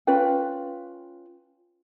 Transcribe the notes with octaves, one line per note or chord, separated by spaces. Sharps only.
C#4 F4 B4 G5